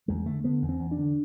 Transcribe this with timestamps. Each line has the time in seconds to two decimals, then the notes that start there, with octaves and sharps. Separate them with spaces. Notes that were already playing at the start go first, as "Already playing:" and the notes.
0.08 E2 G#3
0.26 D3 A3
0.44 D3 B3
0.62 E2
0.69 C4
0.79 E2
0.91 D4
0.97 D3